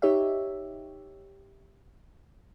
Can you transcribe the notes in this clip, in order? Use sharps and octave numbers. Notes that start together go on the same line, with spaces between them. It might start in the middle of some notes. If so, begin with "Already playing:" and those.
D#4 G4 C#5 E5